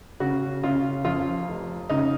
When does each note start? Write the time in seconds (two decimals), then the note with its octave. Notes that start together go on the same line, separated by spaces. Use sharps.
0.20 C#3 F#4
0.63 C#3 F4
1.05 F2 F4
1.48 F1
1.89 C#3 D#4